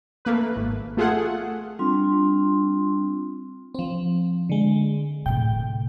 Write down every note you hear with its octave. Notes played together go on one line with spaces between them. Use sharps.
A3 A#3 B4
G#1
A3 F4 G#4 A4 F#5
G3 C4 D4 F4 C6
F3 C4
D3 G#3
A2 C3 G5